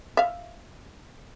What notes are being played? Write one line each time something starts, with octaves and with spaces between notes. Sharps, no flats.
E5 F5